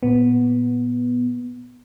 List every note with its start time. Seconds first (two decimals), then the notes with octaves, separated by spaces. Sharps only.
0.03 A#2 B3